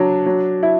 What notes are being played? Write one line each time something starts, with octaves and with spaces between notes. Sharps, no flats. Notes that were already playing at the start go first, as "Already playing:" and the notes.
Already playing: F#3 D4
F#3
E4